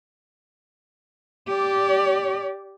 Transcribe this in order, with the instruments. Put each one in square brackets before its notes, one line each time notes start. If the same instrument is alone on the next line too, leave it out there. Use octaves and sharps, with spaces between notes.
[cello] G4 D5